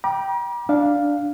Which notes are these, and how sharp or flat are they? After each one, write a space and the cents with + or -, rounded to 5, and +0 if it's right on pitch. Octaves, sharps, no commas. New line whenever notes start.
G5 -5 A#5 +45 D6 +15
D4 +0 F5 +0